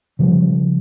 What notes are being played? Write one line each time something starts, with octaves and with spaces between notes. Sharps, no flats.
C#3 F3 G3